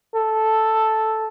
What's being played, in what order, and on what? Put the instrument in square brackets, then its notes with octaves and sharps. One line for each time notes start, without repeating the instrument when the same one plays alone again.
[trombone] A4